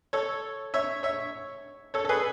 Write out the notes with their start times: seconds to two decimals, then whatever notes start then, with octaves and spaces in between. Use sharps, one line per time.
0.13 A4 C#5
0.74 C#5 E5
1.03 C#5 E5
1.94 A4 C#5
2.05 A4
2.09 G#4 B4